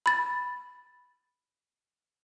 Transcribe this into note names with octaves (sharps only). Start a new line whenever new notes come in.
B5 A6